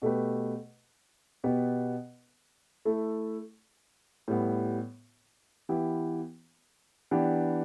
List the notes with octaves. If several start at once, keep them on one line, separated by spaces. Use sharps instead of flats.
B2 A3 G4 B4
B2 B3 G4 B4
A3 E4 A4
A2 G3 B3
E3 B3 E4 G4
E3 B3 D4 G4